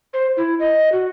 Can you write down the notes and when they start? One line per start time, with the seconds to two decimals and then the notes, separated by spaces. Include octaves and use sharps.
0.13 C5
0.37 E4
0.60 D#5
0.92 F#4